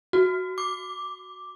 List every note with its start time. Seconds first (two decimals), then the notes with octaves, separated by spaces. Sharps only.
0.13 F#4
0.58 D6